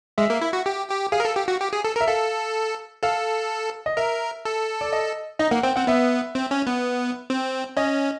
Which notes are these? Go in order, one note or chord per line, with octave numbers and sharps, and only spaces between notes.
G#3 E5
A#3
E4
F#4
G4
G4
G#4 F5
A#4
A4
G4
F#4
G4
G#4
A4
A#4
E5
A4 F5
A4 F5
D#5
A#4 E5
A4
D5
D#5
D#4 D#5
A#3 F#5
C4 G5
C4 F#5
B3 E5
C4
C#4
B3
C4
C#4 D#5